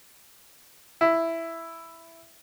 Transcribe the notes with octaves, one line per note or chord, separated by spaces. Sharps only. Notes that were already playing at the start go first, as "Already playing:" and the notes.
E4